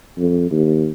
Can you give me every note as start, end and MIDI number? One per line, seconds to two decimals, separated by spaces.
0.18 0.48 41
0.51 0.91 39